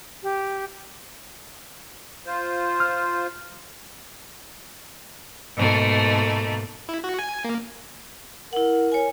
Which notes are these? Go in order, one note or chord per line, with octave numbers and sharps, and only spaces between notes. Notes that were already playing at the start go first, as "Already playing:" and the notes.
G4
F4 C5
F6
G#2 B2 A3 A#3
E4
F#4
G#5
A#3
E4 A#4 F#5
C#5 G#5